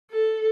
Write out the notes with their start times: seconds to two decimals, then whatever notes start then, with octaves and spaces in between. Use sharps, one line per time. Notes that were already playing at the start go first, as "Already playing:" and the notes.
0.11 A4